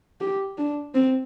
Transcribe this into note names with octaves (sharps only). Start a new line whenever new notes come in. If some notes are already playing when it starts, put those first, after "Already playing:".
G4
D4
C4